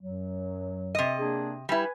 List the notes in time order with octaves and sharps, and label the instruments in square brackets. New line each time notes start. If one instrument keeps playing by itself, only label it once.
[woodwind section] F#2 F#3
[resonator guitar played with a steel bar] C3 D#5
[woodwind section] A#3 D4 G#4
[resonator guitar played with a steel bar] G3 E4 [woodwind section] B4 G#5